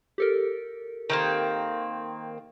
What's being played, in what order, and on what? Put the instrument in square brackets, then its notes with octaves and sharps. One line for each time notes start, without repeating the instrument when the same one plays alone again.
[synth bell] G4 A4 A#4
[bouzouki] D#3 A#3 C4